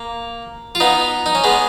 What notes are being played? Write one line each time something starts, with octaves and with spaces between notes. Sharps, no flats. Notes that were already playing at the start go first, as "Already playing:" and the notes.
Already playing: A#3
F4
B3 D#4
D#4
C#4
G#3 B3